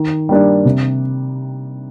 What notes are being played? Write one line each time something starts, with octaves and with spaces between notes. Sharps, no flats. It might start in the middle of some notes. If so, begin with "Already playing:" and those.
Already playing: D#3
G3 A#3 D4
C3